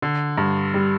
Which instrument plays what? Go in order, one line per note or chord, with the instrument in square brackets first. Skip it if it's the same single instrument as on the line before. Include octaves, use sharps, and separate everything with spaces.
[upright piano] D3
G2
G3